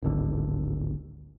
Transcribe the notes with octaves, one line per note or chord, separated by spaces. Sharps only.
D1 G#1 D3